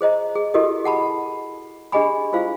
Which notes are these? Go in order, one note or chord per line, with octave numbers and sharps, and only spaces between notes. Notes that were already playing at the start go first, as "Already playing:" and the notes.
G#4 C5 D#5 A#5
G#4
E4 F#4 G4 A4 A#4 D#5
G#4 F#5 A5 B5
D4 G4 G#4 D#5 G#5 B5
E4 F4 C5 F5